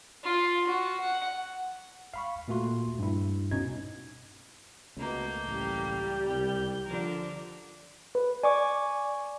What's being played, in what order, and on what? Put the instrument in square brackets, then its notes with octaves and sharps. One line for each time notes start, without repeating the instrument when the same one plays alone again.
[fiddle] F4
F#4
F#5
[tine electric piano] F5 B5 C#6
A#2 A3 A#3 F#4 C6
G2 E4
B2 C#4 D#4 G#6
[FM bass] C#2 [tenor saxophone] B2 [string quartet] A3 A#3 G6
[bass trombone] A1 [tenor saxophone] G3
[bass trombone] C2 [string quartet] G6
[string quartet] D3 D4 A#4 [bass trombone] F3
[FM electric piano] B4
[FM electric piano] D5 [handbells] G#5 C#6 D6